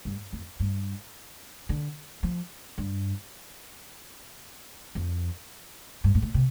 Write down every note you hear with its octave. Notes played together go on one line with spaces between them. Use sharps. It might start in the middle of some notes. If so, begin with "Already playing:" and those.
G2
F2
G2
D3
F3
G2
F2
G2
G2
A2
C3